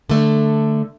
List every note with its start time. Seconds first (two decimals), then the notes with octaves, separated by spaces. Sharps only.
0.09 D3 A3 D4